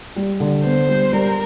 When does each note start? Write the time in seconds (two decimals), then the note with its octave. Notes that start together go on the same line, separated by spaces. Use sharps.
0.16 G3
0.40 D3
0.64 B3 C5
0.89 G3
1.13 G3 A#4